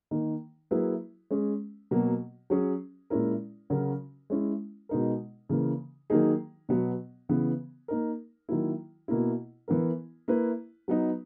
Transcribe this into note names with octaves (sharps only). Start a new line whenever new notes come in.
D#3 A#3 D#4
F#3 A#3 E4 G#4 B4
G#3 C#4 G#4
B2 F#3 A#3
F#3 C#4 G#4
A#2 G#3 C#4 E4 A#4
C#3 F#3 C#4 F#4 A#4
G#3 C#4 E4
B2 G#3 D#4 A#4
C#3 E3 A#3
D#3 F#3 A#3 D#4 G#4
B2 F#3 B3
C#3 E3 B3
A#3 D#4 A#4
D#3 F#3 A#3 E4
B2 A#3 E4
E3 B3 E4 A#4
A#3 E4 B4
F#3 B3 D#4